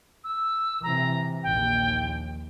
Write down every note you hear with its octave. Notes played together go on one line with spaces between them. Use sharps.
E6
C3 E3 A#5
A#1 D#2 G5